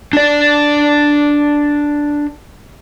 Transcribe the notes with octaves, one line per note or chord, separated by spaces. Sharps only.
D4 D5